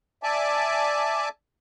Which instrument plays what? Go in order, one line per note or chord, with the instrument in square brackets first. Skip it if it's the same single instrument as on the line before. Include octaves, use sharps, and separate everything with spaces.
[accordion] D5 E5 G#5 A5 D6